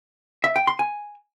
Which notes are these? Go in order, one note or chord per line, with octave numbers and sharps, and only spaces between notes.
E5
G5
C6
G#5